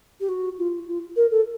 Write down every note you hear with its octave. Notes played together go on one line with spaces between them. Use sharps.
G4
F#4
F4
F4
A#4
A4